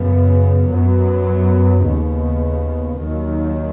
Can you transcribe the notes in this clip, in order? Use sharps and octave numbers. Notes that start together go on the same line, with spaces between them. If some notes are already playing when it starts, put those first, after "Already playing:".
Already playing: F#2 C#3 B3
F#2 F#3 B3
D#2 C#3 B3
D#2 D#3 F#3